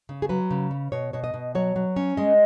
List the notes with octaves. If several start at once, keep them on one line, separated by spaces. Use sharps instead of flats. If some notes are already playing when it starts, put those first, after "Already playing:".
C#3
G#4
F#3 B4
C#3
C#4
B2 C#5
B2 C#5
D#5
B2
F#3 C#5
F#3
C#4
G#3 D#5